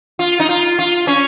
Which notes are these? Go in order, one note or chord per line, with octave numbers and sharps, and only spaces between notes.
F4
D#4
F4
F4
C#4